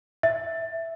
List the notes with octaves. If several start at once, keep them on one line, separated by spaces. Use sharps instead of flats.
E5